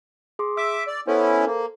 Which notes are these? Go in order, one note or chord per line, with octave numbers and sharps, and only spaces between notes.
G#4 C6 D6
E5 D6 E6
D5
B3 C#4 E4 A4 C5
A#3